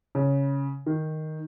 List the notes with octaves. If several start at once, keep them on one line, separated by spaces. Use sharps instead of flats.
C#3
D#3